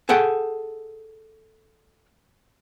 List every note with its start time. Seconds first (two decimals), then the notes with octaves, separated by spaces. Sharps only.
0.09 G#4 A4 F#5 G5